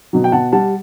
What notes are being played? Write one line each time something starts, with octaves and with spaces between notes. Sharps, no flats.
B2 F#3
G5
B2 F#5 A5
G3 F#5 A5